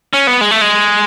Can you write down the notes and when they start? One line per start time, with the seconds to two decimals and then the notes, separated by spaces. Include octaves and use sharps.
0.13 C#4
0.27 B3
0.41 G#3
0.51 A3
0.61 G#3